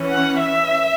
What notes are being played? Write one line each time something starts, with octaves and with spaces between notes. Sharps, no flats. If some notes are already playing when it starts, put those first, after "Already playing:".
Already playing: E3 C#4
F#5
E5